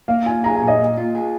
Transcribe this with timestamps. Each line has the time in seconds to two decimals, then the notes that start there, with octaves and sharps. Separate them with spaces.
0.08 A#3 F5
0.26 F4 G#5
0.44 G#4 A#5
0.56 G#5
0.62 A#2
0.68 D#5
0.80 A#3
0.98 F4
1.15 G#4